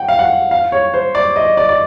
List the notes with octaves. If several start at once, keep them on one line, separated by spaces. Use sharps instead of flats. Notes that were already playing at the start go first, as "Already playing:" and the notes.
Already playing: F#5 G5
F5
F#5
F5
C#5
C5
D5
D#5
D5
D5